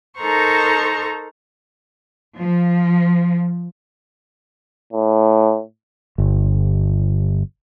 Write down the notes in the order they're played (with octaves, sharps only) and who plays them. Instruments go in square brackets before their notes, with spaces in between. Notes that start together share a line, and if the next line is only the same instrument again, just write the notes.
[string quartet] D#4 A4 A#4 C5 A#5 C#6
[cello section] F3
[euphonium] A2
[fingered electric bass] G1